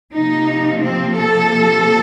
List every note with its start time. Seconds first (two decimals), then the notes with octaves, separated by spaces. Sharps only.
0.14 C3 F3 A#3 D#4
0.83 C4
1.18 A4